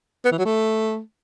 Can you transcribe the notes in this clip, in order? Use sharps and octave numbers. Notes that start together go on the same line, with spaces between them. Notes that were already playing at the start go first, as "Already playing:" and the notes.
B3
E3
F#3
A3